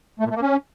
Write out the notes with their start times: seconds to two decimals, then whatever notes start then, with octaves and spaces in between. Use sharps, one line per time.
0.20 A3
0.25 A#2
0.31 A3
0.36 A#3
0.42 C#4